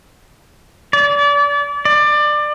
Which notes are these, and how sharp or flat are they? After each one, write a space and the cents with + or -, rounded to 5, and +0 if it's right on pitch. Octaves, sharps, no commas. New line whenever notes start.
D5 -30
D5 +20